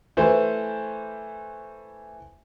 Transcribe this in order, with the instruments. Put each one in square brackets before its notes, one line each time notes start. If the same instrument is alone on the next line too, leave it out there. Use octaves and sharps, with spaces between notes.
[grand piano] E3 A3 C5